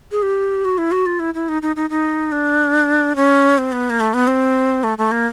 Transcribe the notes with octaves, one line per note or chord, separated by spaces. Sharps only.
G#4
G4
F#4
E4
F#4
F4
E4
E4
D#4
D#4
D#4
D#4
D4
C#4
C4
B3
A#3
A3
B3
C4
A3
A3
A#3